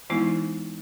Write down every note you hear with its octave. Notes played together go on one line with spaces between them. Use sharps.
E3 G#3 B3 D#4 E4